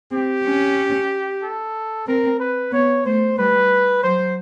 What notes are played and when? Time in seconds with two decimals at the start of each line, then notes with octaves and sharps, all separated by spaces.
0.12 C4 G4
0.45 C#4
1.42 A4
2.07 C4 A#4
2.40 B4
2.72 B3 C#5
3.05 A3 C5
3.37 G3 B4
4.02 F#3 C5